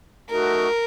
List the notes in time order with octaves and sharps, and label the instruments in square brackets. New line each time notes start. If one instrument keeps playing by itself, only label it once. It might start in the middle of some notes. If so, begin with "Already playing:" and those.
[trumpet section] A3 D#4 F#4 [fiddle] A#4